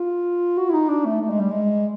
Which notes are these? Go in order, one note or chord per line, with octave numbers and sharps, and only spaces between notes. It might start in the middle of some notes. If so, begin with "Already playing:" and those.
Already playing: F4
F#4
E4
D#4
D4
A3
A3
G#3
G3
G#3